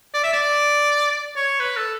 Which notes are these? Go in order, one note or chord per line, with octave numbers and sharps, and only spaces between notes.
D5
E5
D5
C#5
B4
A4